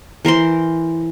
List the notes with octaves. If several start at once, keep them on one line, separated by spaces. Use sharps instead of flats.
E3 A#4 C5 C6